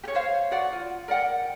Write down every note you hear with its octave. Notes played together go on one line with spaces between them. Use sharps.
G4 C#5
C5 C#5 F5
F#4 D5 F#5
F4
A#4 D5 F#5 G5